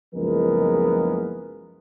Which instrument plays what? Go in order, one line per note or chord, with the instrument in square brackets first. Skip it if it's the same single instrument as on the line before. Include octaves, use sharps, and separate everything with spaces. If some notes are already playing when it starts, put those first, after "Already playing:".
[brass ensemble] F#1 C#2 F3 G#3 B3 A#4